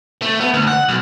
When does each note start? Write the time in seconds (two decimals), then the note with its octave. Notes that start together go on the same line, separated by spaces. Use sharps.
0.22 A3
0.40 B3
0.54 D2
0.68 F#5
0.89 B1